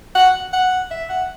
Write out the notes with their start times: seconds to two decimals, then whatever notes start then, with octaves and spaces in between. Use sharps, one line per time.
0.15 F#5
0.53 F#5
0.91 E5
1.10 F#5